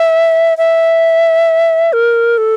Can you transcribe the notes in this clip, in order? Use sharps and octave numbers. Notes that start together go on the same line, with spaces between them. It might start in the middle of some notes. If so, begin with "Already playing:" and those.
Already playing: E5
E5
A#4
A4